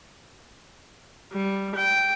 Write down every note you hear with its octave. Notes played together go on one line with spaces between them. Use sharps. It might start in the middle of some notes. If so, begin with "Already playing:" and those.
G3
G5